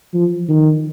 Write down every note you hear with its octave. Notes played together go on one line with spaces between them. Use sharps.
F3
D#3